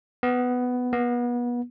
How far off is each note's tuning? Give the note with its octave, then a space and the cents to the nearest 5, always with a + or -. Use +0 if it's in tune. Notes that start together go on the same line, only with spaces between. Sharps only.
B3 +10
B3 -30